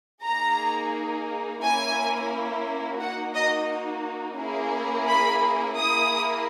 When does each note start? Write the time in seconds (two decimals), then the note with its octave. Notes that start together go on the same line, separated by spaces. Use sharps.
0.24 A#3 D#4 G#4 A#5
1.62 A#3 C#4 E4 G#5
3.00 A#3 D#4 F#4 F#5
3.34 D#5
4.38 A#3 C#4 E4 G#4
5.07 B5
5.76 A#3 E4 G#4 D#6